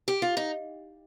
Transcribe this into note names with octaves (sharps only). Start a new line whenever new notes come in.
G4
F4
D#4